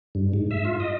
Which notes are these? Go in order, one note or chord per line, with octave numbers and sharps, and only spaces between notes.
G2
G#2
E5
F4
D#5